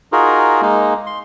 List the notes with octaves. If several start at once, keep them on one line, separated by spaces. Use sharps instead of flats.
D#4 F4 F#4 G#4 A#4
G#3 A#3 D#4
C6